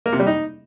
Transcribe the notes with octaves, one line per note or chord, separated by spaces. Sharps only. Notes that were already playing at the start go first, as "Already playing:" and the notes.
A#3
C3
G3
D#4